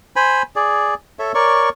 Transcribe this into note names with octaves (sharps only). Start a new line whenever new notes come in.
C5 G#5 B5
G#4 D5
A4 C#5 E5
A#4 C#5 D5 C#6